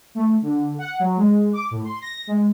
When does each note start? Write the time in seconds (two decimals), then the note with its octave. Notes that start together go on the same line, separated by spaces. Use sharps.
0.15 A3
0.42 D3
0.79 F#5
1.00 F#3
1.17 G#3
1.53 D6
1.71 A2
1.85 C6
2.02 A#6
2.27 G#3